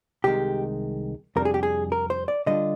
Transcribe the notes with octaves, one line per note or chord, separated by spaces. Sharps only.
C2 C3 D#3 G#3 G4
F2 C3 G3 D4 A#4
G#4
G4
G#4
A#4
C5
D5
D3 G3 D4 F4 D#5